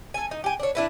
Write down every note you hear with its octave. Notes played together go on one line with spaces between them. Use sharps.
A4 G#5
D#4
G4 G#5
D4 C#5
D4 E4 B4